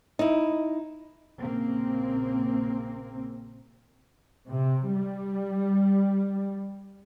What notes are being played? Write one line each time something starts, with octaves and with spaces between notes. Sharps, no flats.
D#4 E4
A#1 C#3 A#3 C4
C3
G3